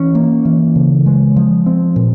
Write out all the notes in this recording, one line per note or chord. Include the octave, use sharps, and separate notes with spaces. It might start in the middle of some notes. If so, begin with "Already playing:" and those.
Already playing: E3 C#4
A#3
E3
C#3
G#3
F3
C4
A#2